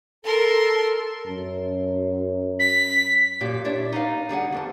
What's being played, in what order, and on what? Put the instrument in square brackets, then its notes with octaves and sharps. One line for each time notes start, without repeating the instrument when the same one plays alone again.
[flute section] A4 [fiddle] A#4 C6
[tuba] F#2
[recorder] B6
[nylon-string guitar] F#2 A#2 G4
D4 E4 C#5 E5
D#4 B4 F5
D3 G3 G#4 F#5
F2 C4 A5